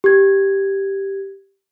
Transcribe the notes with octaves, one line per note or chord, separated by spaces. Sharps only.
G4 G#6